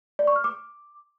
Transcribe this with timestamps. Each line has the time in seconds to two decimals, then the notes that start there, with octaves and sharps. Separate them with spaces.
0.19 D5
0.27 C#6
0.36 F6
0.44 D6